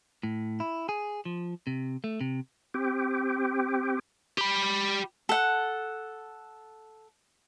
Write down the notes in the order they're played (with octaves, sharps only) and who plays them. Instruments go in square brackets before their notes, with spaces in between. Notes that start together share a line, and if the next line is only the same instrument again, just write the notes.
[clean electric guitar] A2
E4
G#4
F3
C3
A3
C3
[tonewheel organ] C4 G4
[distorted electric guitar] G4 B5
[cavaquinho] A4 F#5